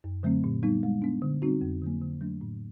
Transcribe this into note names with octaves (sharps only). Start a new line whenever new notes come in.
F#2
D3 F#3 A3 C4
A#2
G3 B3 D#4
G#3
B3 D4
D3
G3 C4 D#4 F#4
F2
D3 F#3 A#3
D3
F#3 A3 D4
A2